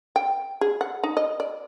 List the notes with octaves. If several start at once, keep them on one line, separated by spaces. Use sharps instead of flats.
G5
G#4
F#5
D#4
D#5
D5